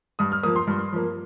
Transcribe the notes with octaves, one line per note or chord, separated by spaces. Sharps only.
G2 D#6
F6
F3 A#3 D#6
C6
G2
F3 A#3